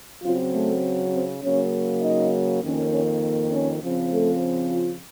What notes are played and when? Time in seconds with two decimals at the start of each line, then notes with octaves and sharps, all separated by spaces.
0.22 C#3 F#3 C4 F4
0.52 A3 A4
1.12 C4 C5
1.42 C#3 F#3 A#3 C#4 C#5
2.02 D#4 D#5
2.62 F2 D#3 A#3 C#4
2.91 C#4 C#5
3.52 C#4 C#5
3.81 C#3 F3 C4
4.11 A3 A4
4.71 F4